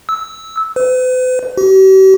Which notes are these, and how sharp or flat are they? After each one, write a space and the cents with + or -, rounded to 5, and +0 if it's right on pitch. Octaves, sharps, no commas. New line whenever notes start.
E6 -15
B4 +45
G4 -45